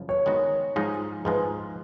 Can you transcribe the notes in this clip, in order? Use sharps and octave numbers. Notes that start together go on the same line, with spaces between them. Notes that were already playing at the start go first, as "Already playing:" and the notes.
Already playing: F#2 C#3 F3
C#5
D#3 G#3 B3 F#4
G#2 F3 G#3 D#4
G#2 F3 G#3 B4